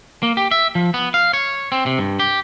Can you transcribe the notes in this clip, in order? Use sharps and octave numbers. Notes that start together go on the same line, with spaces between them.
A#3
G4
E5
F3
B3
F5
C#5
C4
C3
G2
G4